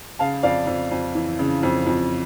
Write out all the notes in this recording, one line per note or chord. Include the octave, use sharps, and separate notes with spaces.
C#3 F5 A5
F2 D5 F5
F2
F2
E3
C#3
F2
F2